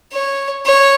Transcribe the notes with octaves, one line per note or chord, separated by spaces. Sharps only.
C#5
C#5